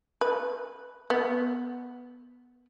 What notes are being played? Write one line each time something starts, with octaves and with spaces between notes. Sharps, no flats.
B4
B3